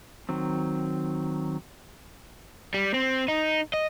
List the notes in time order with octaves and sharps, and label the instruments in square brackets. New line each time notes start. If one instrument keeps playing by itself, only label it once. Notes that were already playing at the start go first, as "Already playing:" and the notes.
[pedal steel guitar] D#3 F#3 C4
[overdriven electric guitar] G3
C4
D#4
D#5